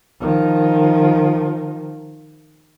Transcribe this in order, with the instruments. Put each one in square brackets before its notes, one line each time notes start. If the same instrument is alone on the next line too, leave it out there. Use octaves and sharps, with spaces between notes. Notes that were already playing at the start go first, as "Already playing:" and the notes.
[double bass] D#3 F3